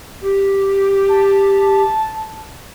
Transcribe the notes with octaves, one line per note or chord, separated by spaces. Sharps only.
G4
A5